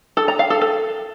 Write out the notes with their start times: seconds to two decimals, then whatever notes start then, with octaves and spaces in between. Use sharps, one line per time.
0.17 A4
0.28 A#5
0.39 F5
0.50 A4
0.61 A4